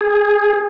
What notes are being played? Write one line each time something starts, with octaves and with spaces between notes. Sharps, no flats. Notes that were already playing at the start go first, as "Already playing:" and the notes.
G#4